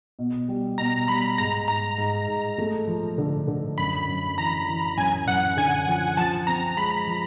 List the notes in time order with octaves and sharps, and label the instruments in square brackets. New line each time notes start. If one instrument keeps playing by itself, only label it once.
[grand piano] B2
G3
[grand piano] B2 [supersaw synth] A#5
[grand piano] G3 [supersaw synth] B5
[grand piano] G#2 [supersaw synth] A#5
[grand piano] G#2 [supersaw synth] A#5
[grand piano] G#2
G#2
A3
F3
D3
D3
[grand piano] F#2 [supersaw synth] B5
[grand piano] F#2
[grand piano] E3 [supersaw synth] A#5
[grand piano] E3
[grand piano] F#2 [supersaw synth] G#5
[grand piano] F#2 [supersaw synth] F#5
[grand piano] D3 [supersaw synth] G#5
[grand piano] F3
[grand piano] F3 [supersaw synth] A5
[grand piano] C4 [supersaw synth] A#5
[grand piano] G#3 [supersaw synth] B5
[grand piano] F3